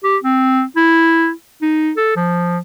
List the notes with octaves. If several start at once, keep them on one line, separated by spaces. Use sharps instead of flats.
G4
C4
E4
D#4
A4
F3